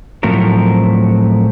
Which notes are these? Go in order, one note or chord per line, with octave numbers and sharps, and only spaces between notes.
A2 F3 F#3 A3 C4 A#4